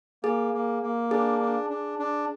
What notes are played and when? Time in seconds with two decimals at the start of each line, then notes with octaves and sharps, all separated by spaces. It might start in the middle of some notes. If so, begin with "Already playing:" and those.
0.23 A#3 G#4
0.54 A#3
0.83 A#3
1.11 D4 G#4
1.41 D4
1.70 D4
1.99 D4